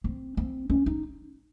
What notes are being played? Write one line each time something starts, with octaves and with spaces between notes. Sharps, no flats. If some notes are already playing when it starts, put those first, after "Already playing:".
C4
C4
C#4
D#4